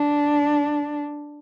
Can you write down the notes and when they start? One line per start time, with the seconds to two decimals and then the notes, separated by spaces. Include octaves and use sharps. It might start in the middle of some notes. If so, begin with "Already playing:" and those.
Already playing: D4